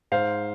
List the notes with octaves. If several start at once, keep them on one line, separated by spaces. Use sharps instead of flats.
G#2 C5 F5